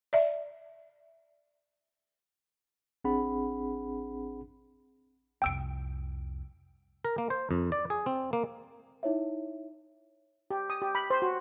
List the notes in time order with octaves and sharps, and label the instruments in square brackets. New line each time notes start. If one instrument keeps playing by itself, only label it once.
[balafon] D5 E5
[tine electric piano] A1 C4 D4 G#4 F#5 B5
[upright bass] C2 F2 [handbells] G5 E6 D7
[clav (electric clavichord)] A#4
A#3
C5
F2
D5
G#4
C4
A#3
[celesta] D#4 E4 C#5 E5
[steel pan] G4
D#6
G4
B5
C5
F#4